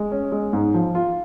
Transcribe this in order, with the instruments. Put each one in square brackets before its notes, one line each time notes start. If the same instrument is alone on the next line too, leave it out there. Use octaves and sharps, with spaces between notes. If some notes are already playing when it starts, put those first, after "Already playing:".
Already playing: [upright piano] G#3
C#4
G#3
G#2
F3
F4